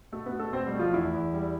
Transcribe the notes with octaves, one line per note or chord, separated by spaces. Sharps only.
B2 A3 A4
B3 B4
B2
A3 A4
B2 C4 C5
G3 G4
A3
F3 F4
E2 E4
E2
G3